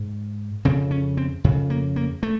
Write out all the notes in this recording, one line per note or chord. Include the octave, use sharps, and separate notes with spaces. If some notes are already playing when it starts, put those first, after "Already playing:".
Already playing: G#2
F2 C#3 C4
C#4
C4
F2 C#3
A#3
A#3
A3